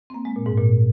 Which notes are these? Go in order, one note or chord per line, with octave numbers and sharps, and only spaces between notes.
C4
A#3
G#3
A#2
G#2
A#2